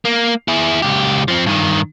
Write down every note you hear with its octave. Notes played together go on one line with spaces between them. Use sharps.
A#3
E4 G#4
C#2 G4
F3 C4
G2 D#3